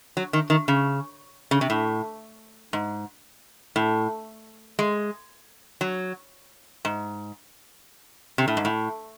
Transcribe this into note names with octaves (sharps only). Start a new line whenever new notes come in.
F#3
D#3
D#3
C#3
C#3
C3
A2
G#2
A2
G#3
F#3
G#2
C3
A2
G#2
A2